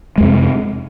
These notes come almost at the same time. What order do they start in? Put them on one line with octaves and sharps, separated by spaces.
G#3 F2 C3